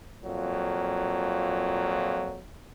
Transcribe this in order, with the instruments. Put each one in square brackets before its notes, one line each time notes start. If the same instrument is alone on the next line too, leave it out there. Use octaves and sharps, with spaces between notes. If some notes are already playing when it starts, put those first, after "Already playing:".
[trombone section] F2 A#2 F#3